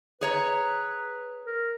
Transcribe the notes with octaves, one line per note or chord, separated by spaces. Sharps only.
G#4 B4 C#5 A#5
A#4